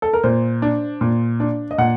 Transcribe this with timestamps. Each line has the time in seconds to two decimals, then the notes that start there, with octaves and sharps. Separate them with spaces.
0.02 A4
0.13 A#4
0.23 A#2 C5
0.62 D4
1.01 A#2
1.40 D4
1.71 D#5
1.78 A#2 F#5